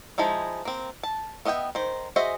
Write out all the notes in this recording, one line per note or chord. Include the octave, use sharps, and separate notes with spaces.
F3 G#3 D#4 E4
A#3 C4
A5
B3 D#5 E5 F#5 G5
D#3 C5
F#4 G#4 C5 D#5 E5